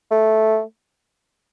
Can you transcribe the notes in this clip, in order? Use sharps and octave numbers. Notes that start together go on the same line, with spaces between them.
A3